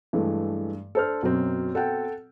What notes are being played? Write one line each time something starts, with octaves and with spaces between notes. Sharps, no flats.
G2 E3 G#3 A3
D4 A4 C5 F6
F#2 B2 F#3 C4
A4 F#5 G5